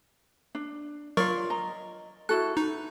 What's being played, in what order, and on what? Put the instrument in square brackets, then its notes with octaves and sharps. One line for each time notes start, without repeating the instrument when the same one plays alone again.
[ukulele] D4
[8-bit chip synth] F#3 A#4 C#6 [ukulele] F4 D5
[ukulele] D#5 A#5
[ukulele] E4 F#4 A4 [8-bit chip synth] F#6
[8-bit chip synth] D#4 [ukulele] B4